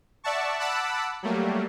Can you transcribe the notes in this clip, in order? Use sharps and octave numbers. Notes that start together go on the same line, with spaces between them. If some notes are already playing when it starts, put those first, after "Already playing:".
D5 E5 F#5 A5 C#6
F#5 A5 B5 D6 E6 F#6
F#3 G3 A3 A#3